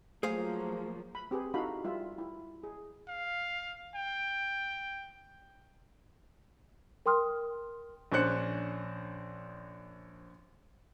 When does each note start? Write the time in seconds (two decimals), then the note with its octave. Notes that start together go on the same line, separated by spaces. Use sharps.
0.23 F3 F#3 A3 A#3 G#4 C5 F5
1.15 B5
1.31 C4 G4 G#4 B4
1.54 D#4 E4 F#4 A4 F5 B5
1.84 G3 F4 E5
2.18 E4
2.63 G#4
3.08 F5
3.95 G5
7.06 A#4 G5 C6 D#6 F6
8.12 A#1 C#4 D4 C5 F#6 C#7